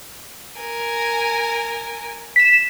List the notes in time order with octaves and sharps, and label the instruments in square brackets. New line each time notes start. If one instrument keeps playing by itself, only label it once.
[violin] A#4 G#5
[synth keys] B6 E7